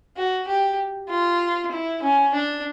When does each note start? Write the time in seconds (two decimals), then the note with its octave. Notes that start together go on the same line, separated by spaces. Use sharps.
0.17 F#4
0.47 G4
1.09 F4
1.71 E4
2.02 C#4
2.34 D4